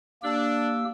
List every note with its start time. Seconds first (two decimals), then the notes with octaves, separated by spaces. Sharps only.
0.23 A#3 D4 G4 E6